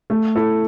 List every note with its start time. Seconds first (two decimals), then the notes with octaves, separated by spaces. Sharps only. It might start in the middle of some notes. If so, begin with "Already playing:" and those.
0.10 A3
0.36 E4 A4